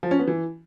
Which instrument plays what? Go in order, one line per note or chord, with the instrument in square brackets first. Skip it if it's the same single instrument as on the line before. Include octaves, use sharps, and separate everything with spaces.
[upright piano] F3
C#4
B3
E3